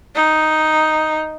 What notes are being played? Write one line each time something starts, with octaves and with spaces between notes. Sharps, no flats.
D#4